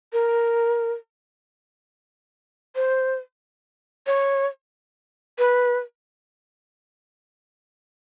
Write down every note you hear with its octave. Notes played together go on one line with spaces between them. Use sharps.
A#4
C5
C#5
B4